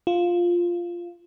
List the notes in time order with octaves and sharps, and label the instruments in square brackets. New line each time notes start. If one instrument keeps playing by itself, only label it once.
[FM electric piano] F4